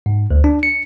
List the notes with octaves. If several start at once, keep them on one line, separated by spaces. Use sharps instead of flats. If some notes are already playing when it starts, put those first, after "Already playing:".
G#2
D2
D4
C#7